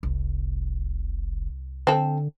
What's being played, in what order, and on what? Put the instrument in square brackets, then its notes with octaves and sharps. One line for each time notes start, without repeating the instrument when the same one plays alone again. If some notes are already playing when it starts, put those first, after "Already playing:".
[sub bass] F1 [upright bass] C2
[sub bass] D3 [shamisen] C4 A4